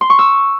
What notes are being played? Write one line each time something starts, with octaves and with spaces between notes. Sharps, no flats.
C6
C#6
E6